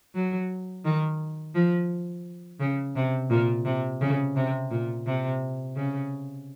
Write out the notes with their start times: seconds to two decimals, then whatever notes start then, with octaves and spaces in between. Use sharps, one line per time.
0.14 F#3
0.85 D#3
1.55 F3
2.60 C#3
2.95 C3
3.30 A#2
3.65 C3
4.01 C#3
4.36 C3
4.71 A#2
5.06 C3
5.76 C#3